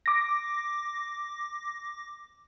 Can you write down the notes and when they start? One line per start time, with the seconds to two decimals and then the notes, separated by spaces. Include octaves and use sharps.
0.06 D6 A#6